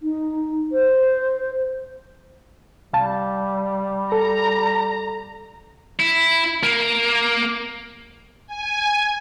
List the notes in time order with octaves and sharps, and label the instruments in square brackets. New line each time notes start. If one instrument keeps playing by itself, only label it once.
[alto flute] D#4
C5
[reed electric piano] C2 F5 A5 [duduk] G3
[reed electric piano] A4 [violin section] A#5
[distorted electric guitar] E4
A#3
[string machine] G#5